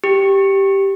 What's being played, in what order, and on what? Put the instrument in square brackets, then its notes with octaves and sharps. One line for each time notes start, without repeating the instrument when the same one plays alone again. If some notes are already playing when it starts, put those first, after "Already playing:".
[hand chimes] G4